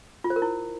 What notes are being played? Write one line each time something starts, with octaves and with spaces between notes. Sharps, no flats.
F4
C5
A#4
E4